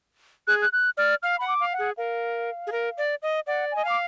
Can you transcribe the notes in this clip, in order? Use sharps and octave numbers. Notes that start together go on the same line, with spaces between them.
G#4 F#6
F#6
F#6
D5 F6
F5 F6
F#5 B5
D6
F5
F#5
G#4
A#4 F5
G#4
A#4
D5
D#5
D5 F#5
D#5 G#5
F5 D6